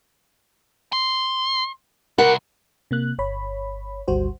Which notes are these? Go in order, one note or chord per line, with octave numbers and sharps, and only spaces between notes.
C6
C2 A#4 F#5
C3 A#3 F#6
G1 C#5 B5
G#1 D2 G3 F#4 C5